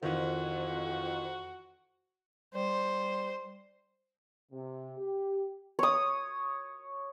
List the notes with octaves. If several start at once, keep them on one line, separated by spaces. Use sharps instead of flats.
F2 D#3 E3 F#4
G3 C5
C3
G4
C#5 D#6